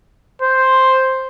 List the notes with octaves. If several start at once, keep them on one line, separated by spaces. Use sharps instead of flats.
C5